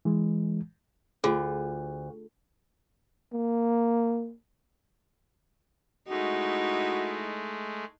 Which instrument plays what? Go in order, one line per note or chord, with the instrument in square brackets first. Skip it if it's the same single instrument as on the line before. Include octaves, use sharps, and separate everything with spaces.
[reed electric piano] E3 G#3
[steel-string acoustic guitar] D2 [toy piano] F4 F#4 G#4
[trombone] A#3
[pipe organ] G#3 A3 [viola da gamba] D#4 E4 [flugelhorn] F#4